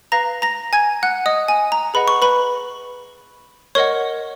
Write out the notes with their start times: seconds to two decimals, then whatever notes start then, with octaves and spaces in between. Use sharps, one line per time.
0.12 B4 F5 A#5 A#6
0.42 A#5 A#6
0.73 G#5 G#6
1.03 F#5 F#6
1.26 D#5 D#6
1.48 G#5
1.72 A#5
1.94 G#4 B4 D#5 F#5 B5
2.08 C#6
2.22 B4 B5
3.75 A#4 C#5 D#5 F#5 C#6